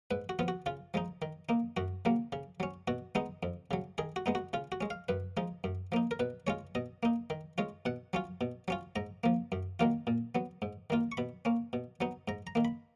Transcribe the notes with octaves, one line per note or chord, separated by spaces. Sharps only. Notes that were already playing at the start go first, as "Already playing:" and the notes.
G#2 B4
F#4
F3 B3 F4
F#4
C#3 F4
F3 G#3 D#4
D#3
A#3 D#4
F#2 F#4
C#3 F#3 A#3
C#3
F#3 C#4
B2 F#4
G#3 B3 D#4
F2
C#3 F#3
D#3 G#4
F#4
G#3 B3 D#4
F#4
C#3 F4
F#4
G#3 C#4
F5
F#2 B4
F3 G#3 D#4
F#2
F3 A#3 D#4
A#4
B2 B4
G#3 C#4 F4 C#5
B2 D#5
A#3 D#4
D#3
G#3 C#4 F4
B2 F#5
F#3 C#4 F4
B2
F#3 C#4 F4
G#2 A#5
F3 A#3
F#2
D#3 F#3 A#3 F4
A#2
F#3 B3
G#2
D#3 A#3 F4
C#6
B2 B5
A#3 C#4
B2
F#3 B3 D#4
G#2 A#5
A#5
D#3 A#3
B5